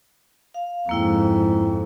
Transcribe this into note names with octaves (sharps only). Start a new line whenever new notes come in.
F5
F2 G#2 A#3 E4 G5